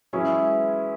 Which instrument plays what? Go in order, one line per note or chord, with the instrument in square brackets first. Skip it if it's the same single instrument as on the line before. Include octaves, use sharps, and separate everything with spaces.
[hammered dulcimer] E3 G#3 [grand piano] F#3 C#4 E4 G#4